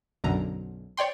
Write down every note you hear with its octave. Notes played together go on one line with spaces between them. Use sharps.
B1 F#2 D3 A#5
C#5 D5 G5 C6